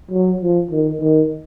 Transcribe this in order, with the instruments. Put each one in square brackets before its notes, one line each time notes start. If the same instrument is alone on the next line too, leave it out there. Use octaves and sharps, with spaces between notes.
[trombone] F#3
F3
D#3
D#3